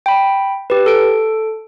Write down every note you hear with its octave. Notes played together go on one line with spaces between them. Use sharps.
G5 B5
G4 B4
A4 D7